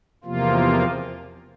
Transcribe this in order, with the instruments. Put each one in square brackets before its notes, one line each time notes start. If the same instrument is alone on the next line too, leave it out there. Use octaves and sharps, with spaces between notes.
[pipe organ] E2 C3 F3 A#3 F4